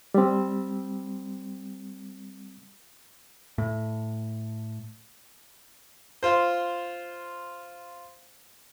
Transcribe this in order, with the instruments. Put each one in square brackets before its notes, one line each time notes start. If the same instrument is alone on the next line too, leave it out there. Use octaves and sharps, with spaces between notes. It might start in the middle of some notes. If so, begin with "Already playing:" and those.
[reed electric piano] G3 C4
[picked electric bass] A2
[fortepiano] F4 C5